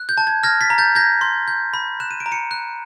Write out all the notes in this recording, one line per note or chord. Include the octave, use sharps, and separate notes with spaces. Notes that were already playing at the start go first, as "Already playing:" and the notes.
Already playing: F#6
G6
A5
G#6
F6 G#6 A#6
A6 B6
A#5
G6 A6
G6 G#6 A#6
C6
G6
B5
F#6 E7
D#7
D7
A#5
C#7 D#7
F#6